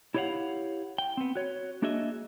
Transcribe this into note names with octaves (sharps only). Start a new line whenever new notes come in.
E4 G4 C#5 D#5 F5 F#5
G5
B3 C4
F#4 C#5
A#3 D4 F#4 G#4 D#5 E5